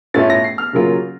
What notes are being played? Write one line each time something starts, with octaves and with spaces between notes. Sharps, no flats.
A2 A3 C#4 F4 A6
A#6
C7
F6
C#3 F#3 A#3 F4